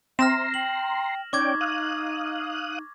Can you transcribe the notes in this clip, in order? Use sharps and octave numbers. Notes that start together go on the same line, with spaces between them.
C4 E5 A#5 C6 F6 A#6 E7
G5 F#7
C#4 D#4 D5 G5 C#6 D6 G#6
F5 D#6 F#6